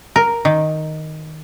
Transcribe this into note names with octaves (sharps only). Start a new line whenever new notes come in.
A#4
D#3